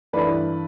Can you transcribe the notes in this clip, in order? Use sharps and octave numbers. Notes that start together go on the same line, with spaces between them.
G2 E3 A3 E4 B4 D5